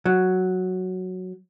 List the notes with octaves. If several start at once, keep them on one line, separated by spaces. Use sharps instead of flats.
F#3